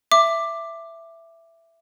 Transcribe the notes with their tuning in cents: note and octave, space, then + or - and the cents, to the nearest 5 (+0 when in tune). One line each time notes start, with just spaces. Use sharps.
E5 +10 D6 +5